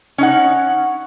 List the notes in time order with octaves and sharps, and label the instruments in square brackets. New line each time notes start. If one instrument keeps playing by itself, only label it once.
[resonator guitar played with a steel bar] C#4 D#4 F#5